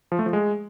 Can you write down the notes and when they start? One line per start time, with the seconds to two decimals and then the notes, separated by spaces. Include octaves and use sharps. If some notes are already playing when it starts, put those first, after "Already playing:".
0.12 F3
0.19 A3
0.26 F3
0.33 G#3